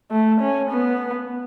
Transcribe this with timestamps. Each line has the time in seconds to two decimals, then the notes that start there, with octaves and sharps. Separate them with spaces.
0.11 A3
0.41 C#4
0.71 B3